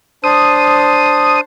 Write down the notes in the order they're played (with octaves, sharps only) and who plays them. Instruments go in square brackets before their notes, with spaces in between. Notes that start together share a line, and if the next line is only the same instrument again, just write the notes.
[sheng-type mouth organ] D4 C5 [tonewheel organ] D#6